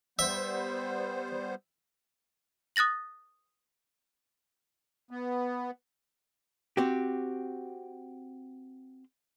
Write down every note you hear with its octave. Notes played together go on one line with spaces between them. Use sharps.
G3 B3 C5 E5
D#6 F#6 A6 A#6 F#7
B3
C4 F#4 G4